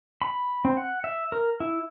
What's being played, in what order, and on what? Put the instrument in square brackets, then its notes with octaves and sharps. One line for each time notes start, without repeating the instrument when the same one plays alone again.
[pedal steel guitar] B5
C4
F#5
E5
A#4
E4